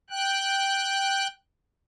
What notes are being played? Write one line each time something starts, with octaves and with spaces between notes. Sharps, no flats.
G5 F#6